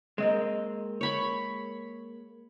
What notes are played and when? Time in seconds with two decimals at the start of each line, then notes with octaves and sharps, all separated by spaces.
0.18 G#3 A#3 C4 D#5
1.01 C#5 B5 C#6